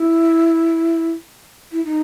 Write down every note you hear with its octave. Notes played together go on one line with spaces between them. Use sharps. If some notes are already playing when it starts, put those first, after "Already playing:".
Already playing: E4
E4
D#4